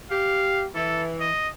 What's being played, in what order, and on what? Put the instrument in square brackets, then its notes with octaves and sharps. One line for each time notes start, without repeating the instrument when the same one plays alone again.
[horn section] G4 [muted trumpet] F5
[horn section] E3 [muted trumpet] A4
[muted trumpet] D#5